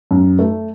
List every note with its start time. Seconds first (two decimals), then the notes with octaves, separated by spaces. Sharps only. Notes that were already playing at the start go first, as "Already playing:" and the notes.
0.11 F#2
0.39 A3